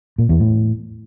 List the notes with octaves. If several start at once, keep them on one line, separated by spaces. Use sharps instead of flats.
A#2
E2
A2